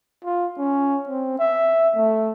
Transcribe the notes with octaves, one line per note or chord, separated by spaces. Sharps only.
F4
C#4
C4
E5
A3